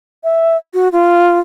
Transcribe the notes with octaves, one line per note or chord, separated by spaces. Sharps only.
E5
F#4
F4